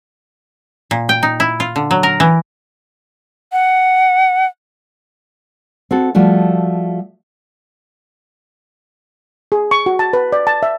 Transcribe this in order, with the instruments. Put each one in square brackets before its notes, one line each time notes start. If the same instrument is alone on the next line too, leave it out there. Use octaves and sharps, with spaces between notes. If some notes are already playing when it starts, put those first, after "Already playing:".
[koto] A#2
G5
D#4
E4
F4
D3
F#3
A#4
E3
[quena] F#5
[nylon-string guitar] C4 F#4 A4
F3 G3 A3 F#4
[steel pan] G#4
C#6
F#4
A5
B4
D5
A5
E5